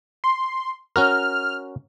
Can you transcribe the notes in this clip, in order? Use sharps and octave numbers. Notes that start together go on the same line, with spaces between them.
C6
C#4 F#4 A#4 F6